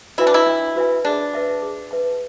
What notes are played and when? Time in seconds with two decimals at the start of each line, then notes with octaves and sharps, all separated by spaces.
0.18 E4 F#4 B4 E5 G#5
0.27 D4
0.34 E4
0.47 D4
0.76 F#4 B4 E5 G#5
1.05 D4 G#4
1.34 B4 E5 A5
1.62 G#4
1.91 B4 E5 A5